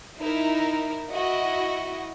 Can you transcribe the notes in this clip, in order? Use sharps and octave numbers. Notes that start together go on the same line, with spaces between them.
D#4 E4 A#4
E4 F#4 D#5